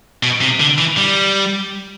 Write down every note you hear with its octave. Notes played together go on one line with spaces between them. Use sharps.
B2
C3
D3
E3
G3